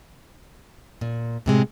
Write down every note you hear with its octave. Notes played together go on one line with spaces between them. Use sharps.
A#2
A2 C3 G#3